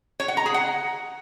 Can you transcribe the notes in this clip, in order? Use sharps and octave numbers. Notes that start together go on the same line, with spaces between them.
C#5
F#5
A#5
G#4
F#5